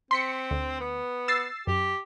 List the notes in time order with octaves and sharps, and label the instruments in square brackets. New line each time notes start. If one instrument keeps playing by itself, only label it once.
[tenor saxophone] C4 [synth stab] C6 B6 C#7
[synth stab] D2
[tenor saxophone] B3
[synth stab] E6 A6 C7
[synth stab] F#2 [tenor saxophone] G4